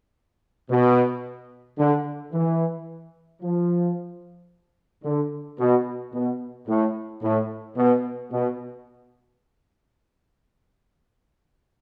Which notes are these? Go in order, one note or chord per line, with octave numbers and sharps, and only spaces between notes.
B2
D3
E3
F3
D3
B2
B2
A2
A2
B2
B2